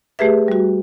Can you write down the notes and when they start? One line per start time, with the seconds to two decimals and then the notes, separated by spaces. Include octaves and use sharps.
0.19 A3 G4 G#4 B4 E5
0.48 G3 F#4